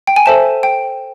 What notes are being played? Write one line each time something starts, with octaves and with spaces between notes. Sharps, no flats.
G5
G#5
A4 C5 E5 A5
G5